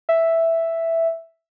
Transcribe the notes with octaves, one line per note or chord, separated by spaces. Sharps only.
E5